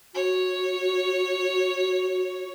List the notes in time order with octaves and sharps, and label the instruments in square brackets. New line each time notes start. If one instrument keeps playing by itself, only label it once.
[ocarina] F#4 [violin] C#5